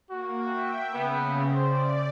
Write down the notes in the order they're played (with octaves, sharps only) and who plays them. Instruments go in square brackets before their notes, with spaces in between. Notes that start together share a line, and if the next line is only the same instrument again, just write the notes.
[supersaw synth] A#3 [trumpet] F#4
[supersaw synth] E5 G5
[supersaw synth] C#3 [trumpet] B3
[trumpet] C5 [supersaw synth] D5